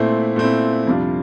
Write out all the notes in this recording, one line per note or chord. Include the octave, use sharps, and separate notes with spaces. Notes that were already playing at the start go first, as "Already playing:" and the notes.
Already playing: A#2 A3 C4 E4
A#2 A3 C4 E4
F2 C3 G3 D4 F4